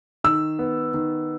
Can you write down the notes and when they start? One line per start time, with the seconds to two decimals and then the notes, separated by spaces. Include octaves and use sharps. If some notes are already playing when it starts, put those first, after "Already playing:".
0.24 D#3 E6
0.59 B3
0.94 D#3